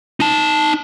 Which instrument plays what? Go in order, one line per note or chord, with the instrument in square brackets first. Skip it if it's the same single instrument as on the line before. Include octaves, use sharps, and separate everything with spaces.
[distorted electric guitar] D#4 A5